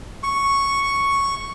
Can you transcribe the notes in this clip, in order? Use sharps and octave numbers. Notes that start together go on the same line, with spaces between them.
C#6